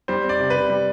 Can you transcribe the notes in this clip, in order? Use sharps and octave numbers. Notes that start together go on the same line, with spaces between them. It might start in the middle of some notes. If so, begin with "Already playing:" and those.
G3 C5
C4
D5
C3
C3 B4
G3